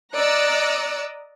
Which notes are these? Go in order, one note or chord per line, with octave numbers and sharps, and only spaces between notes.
D5 D#5 A#5 E6 F#6 C#7